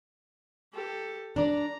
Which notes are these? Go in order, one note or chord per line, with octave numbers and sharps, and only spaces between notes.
G4 A4
D4 D5 A#5